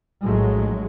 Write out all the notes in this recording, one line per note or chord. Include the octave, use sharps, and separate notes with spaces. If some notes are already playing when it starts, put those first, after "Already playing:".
A#1 A2 F#3 G#3 A3